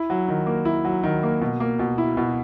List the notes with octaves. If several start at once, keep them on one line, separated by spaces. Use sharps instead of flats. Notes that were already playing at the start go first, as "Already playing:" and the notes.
Already playing: E4
F#3
D#3
A#3
E4
F#3
D#3
A#3
B2
A#3
B2
E4
B2